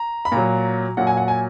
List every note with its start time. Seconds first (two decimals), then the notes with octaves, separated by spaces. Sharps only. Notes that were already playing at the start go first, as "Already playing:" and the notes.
Already playing: A#5
0.25 B5
0.32 A#2 F#3 A#5
0.97 A#2 F#3 F#5
1.07 G#5
1.17 F#5
1.28 G#5